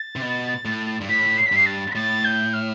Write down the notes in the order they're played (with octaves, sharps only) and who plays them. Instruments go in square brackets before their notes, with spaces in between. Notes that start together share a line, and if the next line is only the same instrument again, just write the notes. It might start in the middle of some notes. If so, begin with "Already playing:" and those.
Already playing: [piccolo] A6
[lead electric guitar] C3
B2
A2
G2
[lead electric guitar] A2 [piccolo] B6
[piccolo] C7
B6
[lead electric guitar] G2 [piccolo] C7
[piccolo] A6
B6
[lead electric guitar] A2 [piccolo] A6
[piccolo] G6
F6